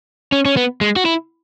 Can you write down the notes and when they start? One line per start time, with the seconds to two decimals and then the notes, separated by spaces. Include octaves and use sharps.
0.32 C#4
0.45 C#4
0.57 B3
0.81 G#3
0.96 F#4
1.05 E4